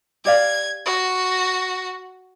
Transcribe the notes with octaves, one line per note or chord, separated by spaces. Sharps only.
G4 D5 F5 G#6
F#4